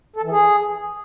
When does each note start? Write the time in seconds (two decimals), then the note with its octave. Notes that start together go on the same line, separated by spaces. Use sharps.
0.16 A4
0.23 E3
0.30 G#4